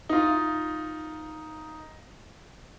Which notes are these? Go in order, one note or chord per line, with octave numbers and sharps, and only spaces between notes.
D#4 F4